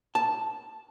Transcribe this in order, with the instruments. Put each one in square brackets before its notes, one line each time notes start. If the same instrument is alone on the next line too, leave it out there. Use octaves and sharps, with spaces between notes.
[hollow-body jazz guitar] A5